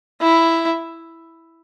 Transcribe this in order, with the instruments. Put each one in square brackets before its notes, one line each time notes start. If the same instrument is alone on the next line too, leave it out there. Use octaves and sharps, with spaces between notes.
[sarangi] E4